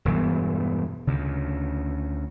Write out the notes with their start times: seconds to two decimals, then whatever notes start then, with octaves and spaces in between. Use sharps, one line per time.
0.05 E1 G2 E3 B3
1.07 D2 C#3